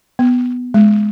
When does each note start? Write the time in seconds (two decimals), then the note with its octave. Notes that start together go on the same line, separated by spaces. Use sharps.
0.19 B3
0.74 G#3